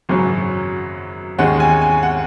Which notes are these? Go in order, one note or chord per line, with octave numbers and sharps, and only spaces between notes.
G#1 F#2 C#3 F#3 C#4
D#2 D#3 G#3 C#4 F#5
G#5
G#5
F#5